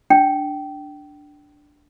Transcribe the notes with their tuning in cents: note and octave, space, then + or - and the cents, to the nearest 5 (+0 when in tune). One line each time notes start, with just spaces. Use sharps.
D4 +0 G5 -20